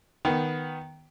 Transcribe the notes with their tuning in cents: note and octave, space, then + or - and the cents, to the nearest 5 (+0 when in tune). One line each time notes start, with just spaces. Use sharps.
D#3 +0 B3 +0